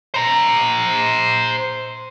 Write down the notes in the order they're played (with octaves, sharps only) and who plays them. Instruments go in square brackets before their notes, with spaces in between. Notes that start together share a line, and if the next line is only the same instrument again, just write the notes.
[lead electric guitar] C5 A#5